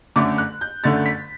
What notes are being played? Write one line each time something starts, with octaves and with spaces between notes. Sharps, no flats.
G1 F#2 D3 A3 D6
F#6
G6
G1 F#2 D3 A3 A6
B6